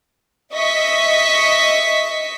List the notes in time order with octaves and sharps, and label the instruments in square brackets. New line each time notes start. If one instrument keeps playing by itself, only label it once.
[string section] D#5 E5 C#6 B6